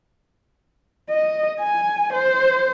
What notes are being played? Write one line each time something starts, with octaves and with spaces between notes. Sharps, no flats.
D#5
G#5
C5